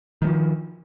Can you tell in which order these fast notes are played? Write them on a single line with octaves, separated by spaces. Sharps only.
D#3 G#3 F3